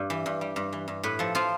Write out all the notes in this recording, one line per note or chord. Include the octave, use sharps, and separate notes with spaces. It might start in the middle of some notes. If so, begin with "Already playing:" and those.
Already playing: G2 G3
E3
G2
G3
G2
E3
G2
A2 B4
F3 A4
F3 F4